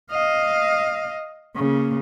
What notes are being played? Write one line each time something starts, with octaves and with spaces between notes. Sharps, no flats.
D#5 F5
C#3 A#3